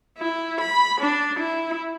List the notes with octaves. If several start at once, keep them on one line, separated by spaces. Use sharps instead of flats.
E4
B5
D4
E4